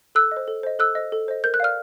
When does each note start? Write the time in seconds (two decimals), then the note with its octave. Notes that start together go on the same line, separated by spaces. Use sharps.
0.15 A4 E6 F#6
0.31 D#5
0.37 C5
0.48 A4
0.63 C5 D#5
0.79 A4 E6 F#6
0.95 C5 D#5
1.12 A4
1.28 C5 D#5
1.44 A#4 G6
1.54 F#6
1.60 D5 F5 F6